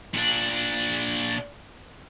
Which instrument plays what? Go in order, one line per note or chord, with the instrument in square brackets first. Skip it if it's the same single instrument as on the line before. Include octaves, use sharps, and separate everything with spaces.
[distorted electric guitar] A#2 D4